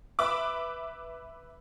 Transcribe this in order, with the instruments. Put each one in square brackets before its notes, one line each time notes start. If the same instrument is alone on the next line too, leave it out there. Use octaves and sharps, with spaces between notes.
[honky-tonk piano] B4 E5 B5 D6